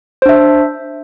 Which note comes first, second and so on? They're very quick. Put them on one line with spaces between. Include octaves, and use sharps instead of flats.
C5 D4 E5